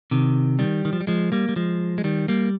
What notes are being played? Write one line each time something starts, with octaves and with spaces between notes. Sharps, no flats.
C3 D#3
D#3 G3
D#3
F3
G3
F3 G#3
G3 A#3
G3
F3 G#3
G#3
D#3 G3
G3 A#3